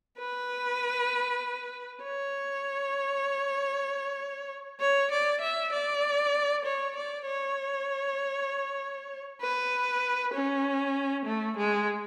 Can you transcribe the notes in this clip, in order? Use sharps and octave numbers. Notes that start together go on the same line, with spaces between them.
B4
C#5
C#5
D5
E5
D5
C#5
D5
C#5
B4
C#4
A3
G#3